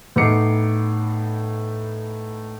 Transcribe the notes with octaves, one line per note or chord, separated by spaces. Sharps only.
A2 B3 D#4 D6 C7 C#7